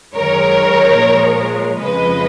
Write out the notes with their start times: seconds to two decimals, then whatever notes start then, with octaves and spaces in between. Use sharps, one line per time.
0.15 F#2 D#3 G#3 A#4 C#5
0.96 A#2 F3 G#3
1.78 F2 C#3 F3 G#3 B4 D#5